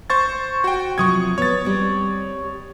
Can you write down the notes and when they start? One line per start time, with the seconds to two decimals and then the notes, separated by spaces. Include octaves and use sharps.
0.10 C5 C#6 A6
0.64 F#4 G5
0.98 C3 F3 F#3 C#6 D#6 G#6
1.38 B3 C#5 A6
1.65 G3 C4